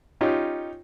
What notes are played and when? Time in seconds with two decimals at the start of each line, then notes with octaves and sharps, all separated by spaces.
0.21 C#4 D#4 F4 G4